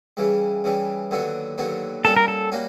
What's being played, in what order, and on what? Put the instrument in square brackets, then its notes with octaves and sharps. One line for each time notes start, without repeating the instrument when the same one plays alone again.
[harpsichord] C#3 E3 G3
C#3 E3 G3
D#2 D3 F#3 B3 D4
D#2 D3 F#3 B3 D4
[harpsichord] A#2 G3 A#3 C#4 F#4 [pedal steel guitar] A4
[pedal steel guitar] A#4
A4
[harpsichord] G3 A#3 C#4 F#4